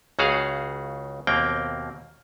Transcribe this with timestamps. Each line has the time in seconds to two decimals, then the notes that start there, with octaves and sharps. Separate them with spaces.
0.19 C#2 C#3 F#4 G#4 F5
1.27 D#2 B2 A#3 C4 G5